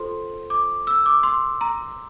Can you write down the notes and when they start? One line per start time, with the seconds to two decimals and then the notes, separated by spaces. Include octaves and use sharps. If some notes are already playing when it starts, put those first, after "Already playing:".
Already playing: F4 A4 C5 C6
0.50 D6
0.87 E6
1.06 D6
1.23 C6
1.61 A#5